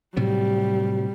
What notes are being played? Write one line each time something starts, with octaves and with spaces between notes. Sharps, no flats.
A2 C3 F#3 G3